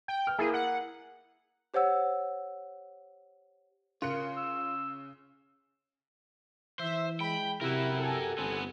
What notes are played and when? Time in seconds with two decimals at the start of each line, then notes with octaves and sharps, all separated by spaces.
0.08 G5
0.27 F6
0.39 A#3 E4 G#4
0.54 F#5
1.74 G4 C5 C#5 F#5 E6
4.02 C#3 F4 A#4 F#6 C#7
4.37 E6
6.79 E3 C5 E5
7.20 G#3 G5 B5
7.61 C3 E4 F#4 G4 A#4
7.98 A4 G#5
8.38 G1 B3 C4